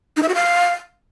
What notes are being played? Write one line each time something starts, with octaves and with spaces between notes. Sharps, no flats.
D#4
E5
F#4
F5